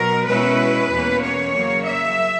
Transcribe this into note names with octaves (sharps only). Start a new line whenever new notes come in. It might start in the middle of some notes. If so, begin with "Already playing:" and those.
Already playing: B2 F#3 A#4
B2 G#3 C#4 E4 B4
E2 B2 A#3 C#4
C#5
C#3 F#3 A#3
E5